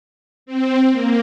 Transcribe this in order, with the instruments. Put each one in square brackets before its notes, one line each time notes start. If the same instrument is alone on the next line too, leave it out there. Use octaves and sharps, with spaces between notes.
[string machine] C4
A#3